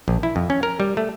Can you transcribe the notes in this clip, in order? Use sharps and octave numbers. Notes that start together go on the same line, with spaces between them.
A#1
E4
F2
C#4
A#4
G3
A3